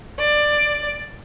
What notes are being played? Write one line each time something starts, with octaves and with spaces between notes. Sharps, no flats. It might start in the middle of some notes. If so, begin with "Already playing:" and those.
D5